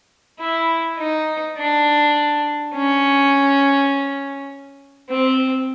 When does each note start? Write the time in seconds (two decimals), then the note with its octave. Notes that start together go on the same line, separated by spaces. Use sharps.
0.39 E4
0.98 D#4
1.57 D4
2.75 C#4
5.10 C4